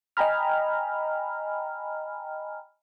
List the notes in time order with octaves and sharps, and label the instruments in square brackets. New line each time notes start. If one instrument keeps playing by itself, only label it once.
[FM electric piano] D#5 G5 G#5 A#5 B5 F6